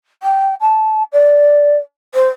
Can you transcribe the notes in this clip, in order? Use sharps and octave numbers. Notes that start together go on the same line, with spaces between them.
G5
A5
D5
C5